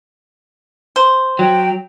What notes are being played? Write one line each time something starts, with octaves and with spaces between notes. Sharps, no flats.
C5
F#3 G5